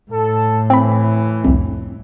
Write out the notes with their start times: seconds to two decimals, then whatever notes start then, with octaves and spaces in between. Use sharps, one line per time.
0.11 A2 A4
0.70 E3 C4 B5
1.44 C2 F2